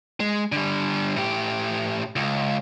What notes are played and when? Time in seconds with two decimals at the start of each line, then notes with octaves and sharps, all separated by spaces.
0.20 G#3
0.52 D3 G3
1.16 A2 G4
2.16 C#2